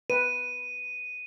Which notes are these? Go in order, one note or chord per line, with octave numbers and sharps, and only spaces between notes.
B4 D#7